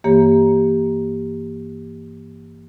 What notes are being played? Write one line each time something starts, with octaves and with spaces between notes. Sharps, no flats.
G2 E3 A#3 G4 C#5 A#5